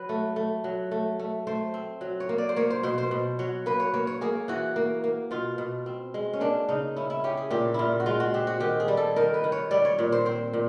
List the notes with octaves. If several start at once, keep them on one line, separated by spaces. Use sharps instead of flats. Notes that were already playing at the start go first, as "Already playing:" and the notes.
Already playing: F#3 B4
A3
A3
F#3
A3
A3
A3 C5
C4
F#3
C#5
A#3
D5
C5
A#3 C#5
C5
B2 C5
C5
B2
F#3 C#5
A#3 B4
C#5
A#3 C#5
C#5
A#3 G#4
E3 F#4
A#3
A#3
B2 F4
B2
C4
G#3
C#4
A#3 D4
C#3 D#4
C#4 E4
E4
C#4 G4
G#4
A#2 G4
A#2 E4 F4
F#4
G#3 F4
F#4
C4 G4
F#4
D#3 G4
G#4
G3
A4
D#3 A#4
B4
D#3
C#5
G3 D5
C#5
A#2 C#5
C5
C4 C5
A#2